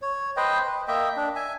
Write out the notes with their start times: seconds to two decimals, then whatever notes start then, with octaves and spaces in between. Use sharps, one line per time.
0.02 C#5
0.37 B4 C5 D#5 G5
0.67 B4
0.88 A#3 D#5 E5 G5
1.17 D4
1.36 E5 G#5